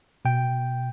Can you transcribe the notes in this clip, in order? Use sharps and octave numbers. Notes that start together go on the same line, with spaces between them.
B2 G5